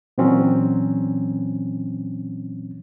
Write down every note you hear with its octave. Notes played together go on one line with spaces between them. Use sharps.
A#2 E3 F#3 C4 C#4